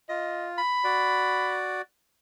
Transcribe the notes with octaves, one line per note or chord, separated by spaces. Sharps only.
F4 D#5
B5
F#4 D5